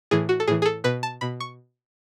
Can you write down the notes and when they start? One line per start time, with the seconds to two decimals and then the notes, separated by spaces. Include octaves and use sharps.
0.11 A2 E3 G#4
0.29 F#4
0.40 A4
0.47 A2 E3 G#4
0.62 G#4
0.66 A4
0.84 B2 B4
1.03 A5
1.21 B2 B5
1.40 C#6